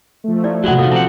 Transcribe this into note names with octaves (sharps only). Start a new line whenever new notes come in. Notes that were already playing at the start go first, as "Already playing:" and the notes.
F3 A3
E4 D5
C3 F#3 G#3 D4 E4 F#4 F#5
F2 A#2 D#3 A4 F5
F3 C4 G4 F#5 A5 A#5